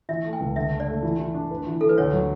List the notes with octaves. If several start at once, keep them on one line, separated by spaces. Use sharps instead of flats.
E3 E5
A3
G5
C#2
D3 E5
A3
D5
A3
E3
E3
D4
B4
E3
E3 A4
B4
D2 C#5
F#3